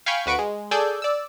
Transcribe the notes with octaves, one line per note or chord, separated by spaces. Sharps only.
F5 G5 G#5 B5 C#6
D2 F#4 B4 C#6 D7
G#3
G#4 A4 D5 G#5 E6 G6
D5 E6